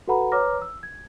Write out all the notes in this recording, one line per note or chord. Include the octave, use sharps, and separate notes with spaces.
F#4 A4 B4 F#5 A#5 B5
B4 C#5 A#5 D6 F6 A#6
E6
G#6